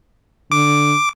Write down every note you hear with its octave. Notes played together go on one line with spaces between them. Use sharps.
D3 D6